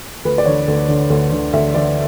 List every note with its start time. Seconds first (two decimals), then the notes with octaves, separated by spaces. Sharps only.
0.25 D2 B4
0.38 D5
0.46 D3 C#5
0.68 D2
0.88 D3
1.10 D2
1.32 D3
1.53 D2 E5
1.74 D3 D5